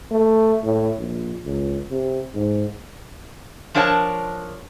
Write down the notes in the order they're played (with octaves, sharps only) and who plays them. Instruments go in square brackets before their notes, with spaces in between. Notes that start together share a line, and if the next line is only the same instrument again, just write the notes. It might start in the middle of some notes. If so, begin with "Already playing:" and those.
[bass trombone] A3
A2
A#1
C#2
C3
G#2
[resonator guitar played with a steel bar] F3 D4 A#4 C#5 F#5 A5